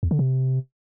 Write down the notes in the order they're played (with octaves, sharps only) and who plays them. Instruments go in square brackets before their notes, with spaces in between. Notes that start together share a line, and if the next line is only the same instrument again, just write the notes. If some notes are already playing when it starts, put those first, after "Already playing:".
[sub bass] E2
D3
C3